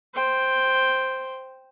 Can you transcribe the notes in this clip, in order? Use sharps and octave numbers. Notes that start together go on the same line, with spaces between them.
C5 G5